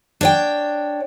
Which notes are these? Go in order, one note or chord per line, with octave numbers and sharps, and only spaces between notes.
D4 C#5 G5